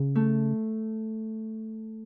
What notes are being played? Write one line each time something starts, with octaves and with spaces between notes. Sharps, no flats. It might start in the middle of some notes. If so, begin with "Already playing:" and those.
Already playing: C#3
A3